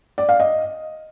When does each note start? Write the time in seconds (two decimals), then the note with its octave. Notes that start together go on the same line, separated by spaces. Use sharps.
0.18 D5
0.29 F5
0.40 D#5